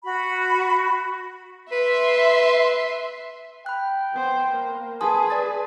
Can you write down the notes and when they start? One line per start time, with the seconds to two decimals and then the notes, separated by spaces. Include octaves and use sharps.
0.04 F#4 B5
1.72 B4 E5 C6
3.66 G5 B5 F#6
4.13 B3 C5
4.49 A#3
5.01 G#4 B4 G#5 A5 C6 D#6
5.30 D5 A6